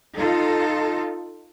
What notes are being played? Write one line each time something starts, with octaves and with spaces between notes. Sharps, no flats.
D#4 F4 A4